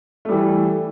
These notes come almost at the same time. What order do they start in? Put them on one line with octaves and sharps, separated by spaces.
A3 G3 E3